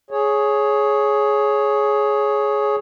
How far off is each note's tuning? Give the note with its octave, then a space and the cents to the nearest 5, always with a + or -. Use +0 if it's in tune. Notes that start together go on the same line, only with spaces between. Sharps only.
G#4 +10 C#5 +0